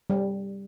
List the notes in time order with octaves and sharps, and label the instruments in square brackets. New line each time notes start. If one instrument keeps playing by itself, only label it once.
[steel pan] G3